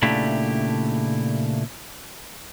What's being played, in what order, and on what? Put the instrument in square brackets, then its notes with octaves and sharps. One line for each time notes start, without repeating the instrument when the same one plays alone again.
[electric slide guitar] A#2 C#3 A3 D4 E4 G4